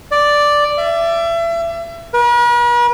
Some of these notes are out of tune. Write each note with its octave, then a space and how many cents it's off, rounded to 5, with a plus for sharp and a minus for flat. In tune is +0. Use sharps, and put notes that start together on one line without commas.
D5 +0
E5 +30
B4 -45